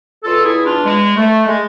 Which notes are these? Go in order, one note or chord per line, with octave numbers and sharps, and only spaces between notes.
E2 B2 F4 A4
E4 G#4
D4 F4
G#3
A3
G#3